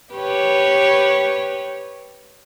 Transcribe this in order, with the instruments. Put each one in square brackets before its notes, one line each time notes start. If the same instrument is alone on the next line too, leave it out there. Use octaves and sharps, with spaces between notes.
[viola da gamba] G4 B4 C#5